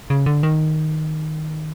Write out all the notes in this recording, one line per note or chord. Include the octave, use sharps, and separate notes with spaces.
C#3
D3
D#3